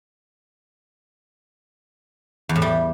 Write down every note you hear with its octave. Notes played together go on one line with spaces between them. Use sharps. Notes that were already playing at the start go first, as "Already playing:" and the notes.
E2
A2
G3